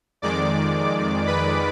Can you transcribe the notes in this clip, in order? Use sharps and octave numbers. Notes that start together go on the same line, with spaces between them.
F2 D#3 G#3 D5 D6
B4 B5